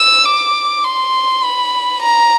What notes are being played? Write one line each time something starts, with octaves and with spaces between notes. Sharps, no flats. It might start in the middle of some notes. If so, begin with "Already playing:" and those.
Already playing: E6
D6
C6
B5
A#5